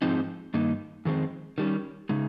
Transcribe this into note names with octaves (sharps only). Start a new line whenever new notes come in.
G#2 F3 C4 D#4
G2 D#3 A#3 D#4
F2 D#3 G#3 C4
D#3 G3 C#4
C#3 G#3 D#4